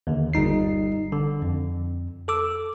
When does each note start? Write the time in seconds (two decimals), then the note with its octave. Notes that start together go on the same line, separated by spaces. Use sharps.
0.07 D#2 D3
0.33 G1 G3 D#4 C7
1.12 D3
1.42 F2
2.28 A4 D6 E6